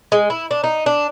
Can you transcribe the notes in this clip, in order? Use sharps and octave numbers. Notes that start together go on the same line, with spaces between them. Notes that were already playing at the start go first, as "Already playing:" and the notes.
G#3
E4
D4
D#4
D4